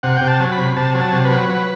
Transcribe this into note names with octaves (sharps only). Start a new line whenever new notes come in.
C3 F#5
C3 G5
A5
F#3
B5
C3
C3 A5
F#3
A5
C3
B4
F#3
F#3